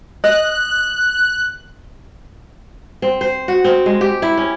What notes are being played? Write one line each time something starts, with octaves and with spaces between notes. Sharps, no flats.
D#5 F#6
C4
C5
F#4
C4
G#3
G4
E4
C#4